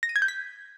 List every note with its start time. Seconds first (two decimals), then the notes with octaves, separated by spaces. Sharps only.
0.03 A#6
0.09 D#7
0.16 G#6
0.22 G6
0.28 B6